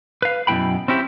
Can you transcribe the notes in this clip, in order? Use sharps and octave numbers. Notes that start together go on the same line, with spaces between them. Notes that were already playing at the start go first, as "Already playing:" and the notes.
B4 F5
F#2 B2 G#3 E4 G5 B5
C4 C#4 E4 G4